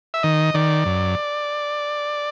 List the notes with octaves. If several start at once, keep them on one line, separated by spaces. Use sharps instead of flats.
E5
D#3 D#5
D#3 D5
F#2